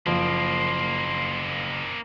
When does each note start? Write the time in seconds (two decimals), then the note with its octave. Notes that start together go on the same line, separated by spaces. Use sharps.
0.06 F#1 F3 A#3 C4 C6